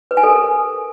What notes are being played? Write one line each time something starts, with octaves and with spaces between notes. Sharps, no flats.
B4
G#5
A4
A#4